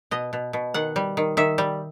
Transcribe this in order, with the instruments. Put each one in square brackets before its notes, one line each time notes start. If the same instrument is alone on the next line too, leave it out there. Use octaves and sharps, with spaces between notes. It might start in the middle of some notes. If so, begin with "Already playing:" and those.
[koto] B2 D#5
B2
B2
D#3 F#5
G3
D#3
D#3 E5
G3